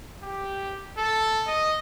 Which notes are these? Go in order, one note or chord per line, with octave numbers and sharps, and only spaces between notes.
G4
A4
D#5